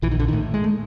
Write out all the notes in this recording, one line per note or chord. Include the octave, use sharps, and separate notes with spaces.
A#1 E3
D#3
D3
A2 D#3
G#3
A3